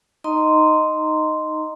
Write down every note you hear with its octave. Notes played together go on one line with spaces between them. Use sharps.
D#4 D#5 A#5 C6